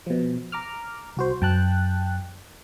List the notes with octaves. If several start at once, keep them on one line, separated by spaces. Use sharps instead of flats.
B2 F3
A#5 D6 F6
C2 F#4 C5
F#2 G5 A5 F#6